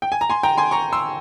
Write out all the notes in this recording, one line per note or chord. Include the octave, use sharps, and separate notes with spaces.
G5
G#5
A#5
G#5 C6
G5 A#5
G#5 C6
A#5 C#6
C6 E6